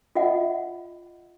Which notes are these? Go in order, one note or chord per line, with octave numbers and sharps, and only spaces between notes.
F4 D#5 E5 F#5